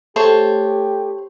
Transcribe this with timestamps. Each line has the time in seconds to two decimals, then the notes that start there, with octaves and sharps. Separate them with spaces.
0.16 A3 G4 C5 C#5 A5